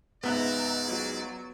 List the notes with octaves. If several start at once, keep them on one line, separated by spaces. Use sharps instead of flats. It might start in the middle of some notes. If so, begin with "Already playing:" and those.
C#2 G#2 B3 D5 E5 A#5 F#6
F#3